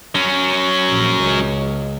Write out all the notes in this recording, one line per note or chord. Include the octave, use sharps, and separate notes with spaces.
F#3 C#4
A#1
C#2